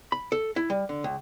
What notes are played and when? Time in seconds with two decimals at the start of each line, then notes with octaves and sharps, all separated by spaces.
0.12 B5
0.32 A4
0.56 E4
0.70 G3
0.89 D3
1.04 C#2